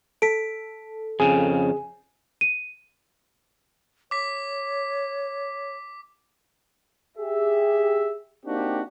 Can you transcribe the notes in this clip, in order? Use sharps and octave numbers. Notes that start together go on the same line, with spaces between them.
A4 B6 D7
F2 C#3 G#4 G#5
D#7
C#5 D6 B6
G4 G#4 E5
A#3 C4 D4 D#4 F#4 G4